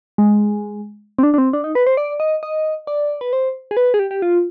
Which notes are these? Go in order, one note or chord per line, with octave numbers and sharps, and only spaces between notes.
G#3
C4
D4
D4
C4
D4
D#4
B4
C5
D5
D#5
D#5
D5
B4
C5
G#4
B4
G#4
G4
G4
F4